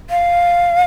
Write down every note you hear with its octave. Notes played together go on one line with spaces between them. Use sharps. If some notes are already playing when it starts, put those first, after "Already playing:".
F5